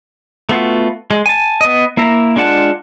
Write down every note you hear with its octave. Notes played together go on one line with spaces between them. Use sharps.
A3 B3 F4 F#4
G#3
G#5 A5
B3 D#5
A#3 E4 E5 A#5
G#3 D4 F4 F#5 A5